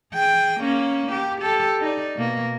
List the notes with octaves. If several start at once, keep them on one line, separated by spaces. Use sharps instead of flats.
G#4 G5
A#3 C#4
G4
G4 A4
D#4 D5
B2 A#3